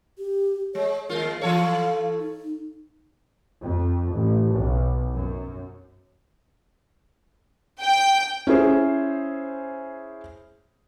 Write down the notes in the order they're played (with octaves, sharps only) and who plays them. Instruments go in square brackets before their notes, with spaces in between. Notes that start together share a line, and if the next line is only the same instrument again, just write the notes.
[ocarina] G4
[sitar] G#3 [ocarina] C#5
[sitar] D#2 G#3 F4 [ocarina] A#4
[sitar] E3 A4 C#5 [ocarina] F5
[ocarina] D#4
[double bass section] F2
A1
B1
F#2
[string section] G5
[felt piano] C#4 E4 G#4 C5